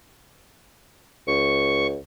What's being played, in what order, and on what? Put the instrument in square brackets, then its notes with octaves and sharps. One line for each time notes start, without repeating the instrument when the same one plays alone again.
[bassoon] C#2 [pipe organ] C#6